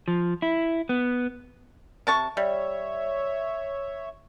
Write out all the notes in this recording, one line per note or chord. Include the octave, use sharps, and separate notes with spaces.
F3
E4
B3
C3 A5 C#6
G3 C#5 E5